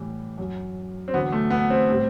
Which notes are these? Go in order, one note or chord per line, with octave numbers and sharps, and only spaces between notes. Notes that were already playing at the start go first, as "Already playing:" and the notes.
Already playing: A2 E3 G3
F#2 F#3
C4
E2 D3 F#3 B3
A3
B3
C4
A2 G3